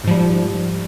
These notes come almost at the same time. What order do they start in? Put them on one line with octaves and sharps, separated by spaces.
G#2 F3 G3